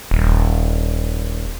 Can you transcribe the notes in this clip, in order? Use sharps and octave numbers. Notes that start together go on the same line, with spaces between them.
D#1